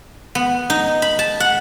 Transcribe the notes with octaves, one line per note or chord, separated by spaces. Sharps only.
B3
D#4
B5
A5
F#5